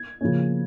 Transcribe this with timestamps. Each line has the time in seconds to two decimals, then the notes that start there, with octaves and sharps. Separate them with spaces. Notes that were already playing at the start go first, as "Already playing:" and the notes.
Already playing: G#6
0.21 C#3 F3 A#3 C#4